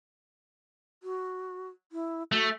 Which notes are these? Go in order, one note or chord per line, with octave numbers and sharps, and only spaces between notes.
F#4
E4
A3 F#4